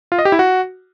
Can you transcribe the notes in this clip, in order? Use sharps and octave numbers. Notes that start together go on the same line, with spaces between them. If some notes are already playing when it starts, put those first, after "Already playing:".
F4
D#5
G4
E4
F#4